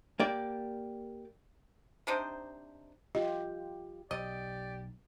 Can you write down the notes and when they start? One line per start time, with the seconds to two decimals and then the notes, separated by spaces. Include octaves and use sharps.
0.20 A#3 G4 D5
2.07 C3 D4 D#4 C5
3.15 F4 G4 D#5
4.11 B1 G4 D5 D#5